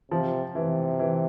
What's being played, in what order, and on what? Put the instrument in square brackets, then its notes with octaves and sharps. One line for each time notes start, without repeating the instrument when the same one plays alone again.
[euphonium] C3 [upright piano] F3
[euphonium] C3 [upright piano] E3
[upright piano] E3